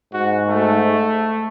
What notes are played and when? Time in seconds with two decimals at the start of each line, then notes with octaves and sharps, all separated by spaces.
0.14 G#2 F#4
0.48 A3